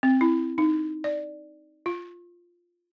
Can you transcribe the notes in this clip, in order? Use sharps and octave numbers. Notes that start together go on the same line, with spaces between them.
C4
E4
D#4
D5
F4